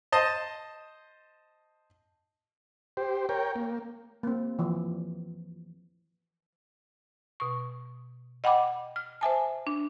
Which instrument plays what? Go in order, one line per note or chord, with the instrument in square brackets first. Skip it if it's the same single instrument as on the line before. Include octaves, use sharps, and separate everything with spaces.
[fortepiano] C5 D#5 A5
[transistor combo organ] G4 C5
A#4 C#5 G5
A#3
[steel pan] A#3 C4
E3 F3
[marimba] B2 C#6
D#5 F#5 G5 B5 D6
F6
C5 E5 G#5 A5
D4